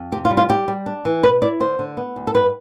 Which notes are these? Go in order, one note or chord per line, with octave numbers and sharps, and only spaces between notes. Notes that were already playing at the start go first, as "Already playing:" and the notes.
Already playing: F2
C3 G4
F4
G3
F4
G3 G4
G3
D4
E3
B2 B4
E4 D5
D3 C5
D3
B3
D2
A4
G2 B4